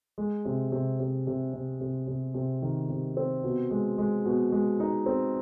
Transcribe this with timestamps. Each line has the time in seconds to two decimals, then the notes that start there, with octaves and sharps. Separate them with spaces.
0.18 G#3
0.45 C3
0.72 C3
1.00 C3
1.27 C3
1.53 C3
1.81 C3
2.07 C3
2.34 C3
2.62 D#3
2.89 C3
3.17 C4
3.44 B2
3.71 G#3
3.98 G#3
4.25 B2
4.52 G#3
4.80 D#4
5.06 C4